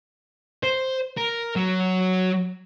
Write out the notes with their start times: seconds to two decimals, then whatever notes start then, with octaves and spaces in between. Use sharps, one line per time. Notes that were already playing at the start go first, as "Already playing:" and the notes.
0.63 C5
1.18 A#4
1.56 F#3